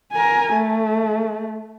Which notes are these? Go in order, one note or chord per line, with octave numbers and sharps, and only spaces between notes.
A#4 G#5
A3